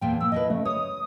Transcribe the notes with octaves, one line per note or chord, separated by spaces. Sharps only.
E2 A#2 F3 G5
A#2 C4 E6
F3 E4 B4 D#5
C#3 A3
C#5 D#6